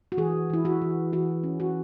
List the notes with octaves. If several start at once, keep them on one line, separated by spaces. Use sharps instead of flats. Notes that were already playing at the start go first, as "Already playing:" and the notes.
F#4
E3 G#4
E3 E4
F#4
E3
E3 F#4
C#4
F#4